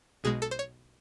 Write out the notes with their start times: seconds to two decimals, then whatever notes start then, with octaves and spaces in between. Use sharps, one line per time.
0.24 B1 B2 G#3 G#4
0.42 A4
0.51 C5
0.59 C#5